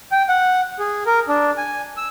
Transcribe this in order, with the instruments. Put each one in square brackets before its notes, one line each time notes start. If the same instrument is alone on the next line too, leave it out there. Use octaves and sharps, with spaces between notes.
[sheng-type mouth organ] G5
F#5
G#4
A#4
D4
G#5
E6